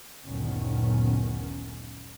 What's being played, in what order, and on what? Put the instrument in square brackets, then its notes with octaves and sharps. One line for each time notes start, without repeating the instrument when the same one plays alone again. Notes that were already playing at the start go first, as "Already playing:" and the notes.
[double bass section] F#1 D2 A#2 D#3 B3 C#4